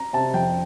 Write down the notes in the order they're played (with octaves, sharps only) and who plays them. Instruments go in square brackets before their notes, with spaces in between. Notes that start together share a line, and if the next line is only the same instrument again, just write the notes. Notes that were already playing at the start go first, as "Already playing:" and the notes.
Already playing: [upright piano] A#5
[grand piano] C3 [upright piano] A5
[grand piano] F2 [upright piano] G5